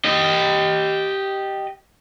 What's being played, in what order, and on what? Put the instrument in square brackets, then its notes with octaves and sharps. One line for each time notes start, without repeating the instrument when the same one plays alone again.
[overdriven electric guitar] G4 D#5